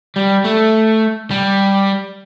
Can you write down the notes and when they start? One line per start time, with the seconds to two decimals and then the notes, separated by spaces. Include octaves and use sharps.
0.16 G3
0.44 A3
1.31 G3